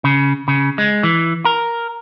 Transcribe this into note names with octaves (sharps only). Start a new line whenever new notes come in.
C#3
C#3
G#3
E3
A#4